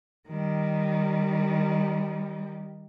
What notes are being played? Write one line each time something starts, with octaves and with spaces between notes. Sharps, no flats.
D#3 G3